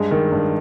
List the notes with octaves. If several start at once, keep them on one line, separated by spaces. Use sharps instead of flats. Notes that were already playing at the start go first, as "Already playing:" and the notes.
Already playing: G2 G#3
D#3
G2